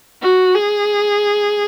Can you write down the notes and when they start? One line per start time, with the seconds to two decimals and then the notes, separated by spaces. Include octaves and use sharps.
0.22 F#4
0.55 G#4